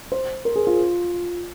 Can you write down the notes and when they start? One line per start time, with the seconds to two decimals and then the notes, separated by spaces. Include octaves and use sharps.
0.12 C5
0.45 A#4
0.56 G#4
0.67 F4